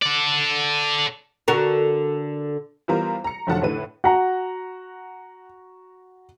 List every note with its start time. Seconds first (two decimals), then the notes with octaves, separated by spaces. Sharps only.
0.02 A4 D5
1.48 D3 F#4 A#4
2.88 E3 G3 B3 F4 A#4 C5
3.24 A#5 C#7
3.47 F1 D3 F3 F#3 F#5 A5
3.61 A2 D3 A3 B4 D#7
4.04 F#4 F#5 A#5